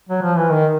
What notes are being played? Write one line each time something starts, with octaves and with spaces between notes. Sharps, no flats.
F#3
F3
E3
D#3